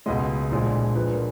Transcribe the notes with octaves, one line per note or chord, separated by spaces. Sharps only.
C#2 B2 G#3 D#5
A#1 A#2 G#3
A#1 A#2 F3 G#3 B4
A#4